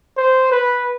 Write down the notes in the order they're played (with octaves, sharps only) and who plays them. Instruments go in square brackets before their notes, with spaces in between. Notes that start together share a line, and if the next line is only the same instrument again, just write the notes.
[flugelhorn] C5
B4